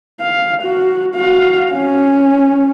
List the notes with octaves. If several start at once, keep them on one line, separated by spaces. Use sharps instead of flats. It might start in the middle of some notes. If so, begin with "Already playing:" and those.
F5
F#4
F#4 F5
C#4